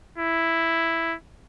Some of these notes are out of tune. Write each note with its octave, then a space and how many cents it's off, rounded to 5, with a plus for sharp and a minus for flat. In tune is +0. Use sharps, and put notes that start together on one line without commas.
E4 +0